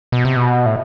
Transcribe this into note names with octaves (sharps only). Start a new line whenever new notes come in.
B2
C3
B2
A2